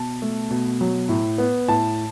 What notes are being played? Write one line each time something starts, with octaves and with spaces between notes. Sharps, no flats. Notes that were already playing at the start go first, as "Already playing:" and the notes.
Already playing: B2 A5
A3
B2
F#3
A2
B3
A2 A5